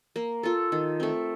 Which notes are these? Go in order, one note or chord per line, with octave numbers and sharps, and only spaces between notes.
A#3
F4 A4
D#3
A3 C4